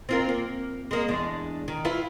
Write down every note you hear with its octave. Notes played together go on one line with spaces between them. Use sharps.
C4 F4 A#4
A#3
G#3 A#3
E2 G#3 D4
D#3
E4 F4 B4